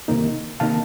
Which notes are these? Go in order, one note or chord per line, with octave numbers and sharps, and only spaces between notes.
C2 C3 D#3 A#3 D#4
C3 D#3 A#3 D#4 F5 A5